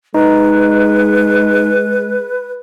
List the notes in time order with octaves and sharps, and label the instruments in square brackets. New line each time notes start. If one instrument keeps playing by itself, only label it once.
[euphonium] G#3 [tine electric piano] D#4 [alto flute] B4